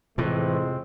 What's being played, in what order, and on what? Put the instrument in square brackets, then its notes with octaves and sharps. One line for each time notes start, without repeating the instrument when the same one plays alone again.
[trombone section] F2 G#3 C4 [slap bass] A2 E3 [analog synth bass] C3